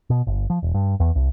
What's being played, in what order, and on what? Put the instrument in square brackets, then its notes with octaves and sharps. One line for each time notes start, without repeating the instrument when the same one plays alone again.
[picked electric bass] B2
G1
F3
E1
G2
E2
C2